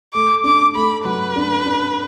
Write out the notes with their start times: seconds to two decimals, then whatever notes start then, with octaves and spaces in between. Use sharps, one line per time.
0.13 A3 D6
0.44 D4 D6
0.75 A3 B5
1.05 F#3 B4
1.36 D4
1.66 D4